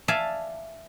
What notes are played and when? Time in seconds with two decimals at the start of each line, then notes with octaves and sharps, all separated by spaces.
0.08 D5 E5 F5 G#5 A5